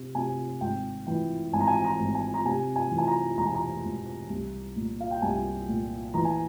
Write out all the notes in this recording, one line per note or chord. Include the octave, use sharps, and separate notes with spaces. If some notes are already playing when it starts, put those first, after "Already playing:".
Already playing: C3
C3 G#5
G#1 G5
E3 G5
G#1 G#5
A#5
G#5
A#5
G#1
G#5
A#5
C3 G#5
G#5
E3
G#5
A#5
E1 A#5
G#5
A#5
E1
C2
A#2
F5
G5
C2 G#5
A#2
E3 A#5
G#5